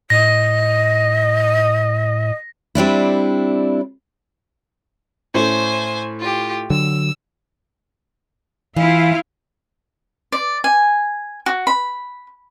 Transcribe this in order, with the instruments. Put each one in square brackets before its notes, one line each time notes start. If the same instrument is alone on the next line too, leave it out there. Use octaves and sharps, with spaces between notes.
[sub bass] A2 [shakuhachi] D#5 [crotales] A#6
[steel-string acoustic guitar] G3 C4 D4 E4
[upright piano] A2 A3 C#4 [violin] C5 G#5
[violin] F4 G4
[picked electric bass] D3 F#3 [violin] E6
[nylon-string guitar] E3 [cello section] E4 F4 F5
[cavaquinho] D5
G#5
F#4
B5